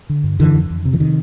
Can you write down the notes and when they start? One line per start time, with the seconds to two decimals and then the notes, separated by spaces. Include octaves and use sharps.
0.10 D3
0.24 G2
0.39 F2 D3 E3
0.54 F2
0.70 F2
0.85 C3
0.93 E3
1.00 C3 D#3